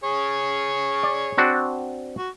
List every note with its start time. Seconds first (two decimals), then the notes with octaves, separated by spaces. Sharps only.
0.04 G#4 C#5
1.03 D5
1.38 C4 D4 F#4
2.18 F#4